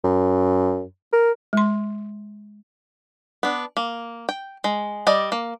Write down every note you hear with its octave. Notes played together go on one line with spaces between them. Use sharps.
F#2
A#4
G#3 C6
B3 D4
A#3
G5
G#3
G3 D5 D#5
A#3